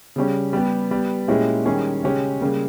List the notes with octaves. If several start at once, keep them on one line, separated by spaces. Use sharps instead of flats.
C#3 G3 C#4
G3 B3 G4
G3 B3 G4
A#2 G#3 C#4 E4 G4
D#3 G3 C#4 G#4
C#3 G#3 C#4 G4
C#3 G3 A#3